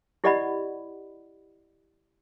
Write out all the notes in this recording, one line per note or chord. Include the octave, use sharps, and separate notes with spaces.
E4 G4 D5 D#5 F#5 B5